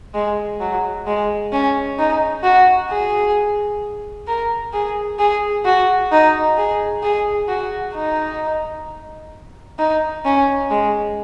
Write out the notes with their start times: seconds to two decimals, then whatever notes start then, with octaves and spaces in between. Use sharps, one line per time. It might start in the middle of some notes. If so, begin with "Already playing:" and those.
0.14 G#3
0.60 F#3
1.07 G#3
1.53 C#4
1.99 D#4
2.44 F#4
2.91 G#4
4.27 A#4
4.74 G#4
5.19 G#4
5.65 F#4
6.12 D#4
6.58 G#4
7.03 G#4
7.49 F#4
7.94 D#4
9.79 D#4
10.25 C#4
10.71 G#3